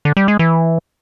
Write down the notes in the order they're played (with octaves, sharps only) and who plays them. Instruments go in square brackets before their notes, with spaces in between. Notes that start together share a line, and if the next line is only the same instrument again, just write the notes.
[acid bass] D3
G3
G#3
E3